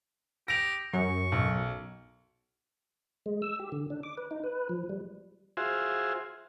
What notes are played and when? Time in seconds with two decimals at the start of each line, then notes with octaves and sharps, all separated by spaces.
0.48 G4 A#6 D7 F7
0.93 F#2 C#6
1.32 B1
3.26 G#3
3.42 E6
3.60 G4
3.72 D3
3.90 D4
4.03 D6
4.17 B4
4.31 D#4
4.44 B4
4.69 F3
4.89 G3
5.57 F4 F#4 G#4 C5 E5